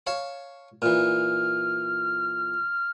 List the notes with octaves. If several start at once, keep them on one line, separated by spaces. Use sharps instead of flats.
C#5 F5 A5
A#2 E3 F6